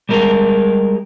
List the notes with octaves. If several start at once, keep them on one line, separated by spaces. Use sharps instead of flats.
G3 G#3 A#4